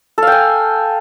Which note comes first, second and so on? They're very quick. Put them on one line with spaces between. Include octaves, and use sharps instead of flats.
A4 F5 G5 G#5